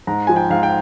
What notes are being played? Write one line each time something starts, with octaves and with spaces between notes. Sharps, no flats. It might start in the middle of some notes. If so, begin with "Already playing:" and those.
G#2 A#5
F3 G#5
G5
G#2 F5
G5